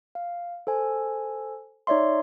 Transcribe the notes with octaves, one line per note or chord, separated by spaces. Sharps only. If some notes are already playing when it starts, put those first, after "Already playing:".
F5
A4 C5 G#5
D#4 C#5 D5 E5 C6